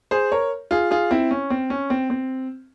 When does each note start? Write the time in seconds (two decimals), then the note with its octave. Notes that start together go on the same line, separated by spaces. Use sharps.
0.11 G#4 C5
0.32 A#4 C#5
0.71 F4 G#4
0.91 F4 G#4
1.11 C4 E4
1.31 C#4
1.50 C4
1.70 C#4
1.90 C4
2.10 C4